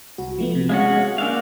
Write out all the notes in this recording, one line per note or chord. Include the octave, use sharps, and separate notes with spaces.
C2 F#4
F3 A3 B3
C3
G#3 C#4 F#4 F5
A#3 D4 F5 G#5 E6 F#6